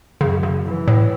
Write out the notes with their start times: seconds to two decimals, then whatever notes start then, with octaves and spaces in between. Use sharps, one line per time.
0.21 F#2 C#3
0.43 C#3
0.65 E3
0.88 A2